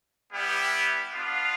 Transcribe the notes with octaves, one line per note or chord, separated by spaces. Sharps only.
G3 B3 E4 G4
B3 D4 F4 F5